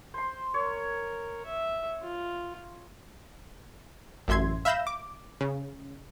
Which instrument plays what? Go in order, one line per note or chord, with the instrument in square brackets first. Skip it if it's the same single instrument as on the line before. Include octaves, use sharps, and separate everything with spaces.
[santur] C5 C6
[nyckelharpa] A#4 [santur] C#5
[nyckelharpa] E5
F4
[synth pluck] A1 F#2 E5 C6 G#6
E5 F5 B5 G6 A#6 E7
D6
C#3